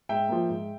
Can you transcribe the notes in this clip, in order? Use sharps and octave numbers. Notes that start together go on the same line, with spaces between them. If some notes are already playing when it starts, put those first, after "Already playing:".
G#2 E5 G5
F3 A#3
G#2